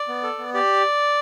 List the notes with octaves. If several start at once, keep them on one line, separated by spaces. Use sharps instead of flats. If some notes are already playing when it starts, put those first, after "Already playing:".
Already playing: D5
B3
A4
B3
G4 D5